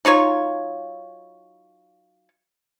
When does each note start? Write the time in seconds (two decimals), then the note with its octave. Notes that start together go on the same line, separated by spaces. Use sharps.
0.05 F#3 D#4 F4 C#5